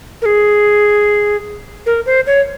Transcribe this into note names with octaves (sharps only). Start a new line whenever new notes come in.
A#4
G#4
A#4
C5
C#5